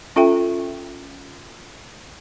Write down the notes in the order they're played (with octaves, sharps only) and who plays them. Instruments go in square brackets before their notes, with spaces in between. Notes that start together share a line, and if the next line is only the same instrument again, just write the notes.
[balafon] C#4 F4 A4 E5 G5